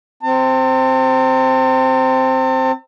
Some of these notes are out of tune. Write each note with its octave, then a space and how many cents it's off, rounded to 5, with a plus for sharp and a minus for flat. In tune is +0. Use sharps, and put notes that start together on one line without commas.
C4 +0 A5 +40